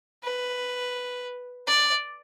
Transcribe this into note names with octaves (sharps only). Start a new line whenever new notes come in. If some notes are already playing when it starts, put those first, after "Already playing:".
B4
D5